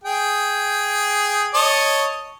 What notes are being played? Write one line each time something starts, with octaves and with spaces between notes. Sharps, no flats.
G#4 G5
C#5 D#5 A5